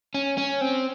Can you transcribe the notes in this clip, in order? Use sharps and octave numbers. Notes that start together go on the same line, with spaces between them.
C#4
C#4
C4